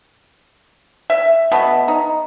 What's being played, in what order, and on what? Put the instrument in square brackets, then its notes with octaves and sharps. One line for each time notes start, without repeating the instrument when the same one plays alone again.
[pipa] E5
B2 A3 B3 B5
D#4